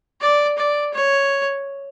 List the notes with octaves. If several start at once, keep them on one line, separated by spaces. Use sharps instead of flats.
D5
D5
C#5